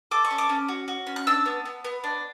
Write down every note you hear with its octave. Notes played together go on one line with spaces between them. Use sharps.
A4 D6
C#6
C#4
D6
C#4
F#4
F#4
C#4
F#6
D4 E6
B3
B3
B3
D4